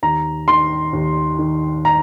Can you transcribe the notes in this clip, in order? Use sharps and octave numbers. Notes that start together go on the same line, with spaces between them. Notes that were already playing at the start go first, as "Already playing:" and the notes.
D#2 A#5
D#3 C6
D#2
D#3
A#5